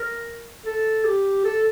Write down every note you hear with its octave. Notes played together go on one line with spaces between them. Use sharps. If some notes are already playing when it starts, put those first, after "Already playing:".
Already playing: A#4
A4
G4
A4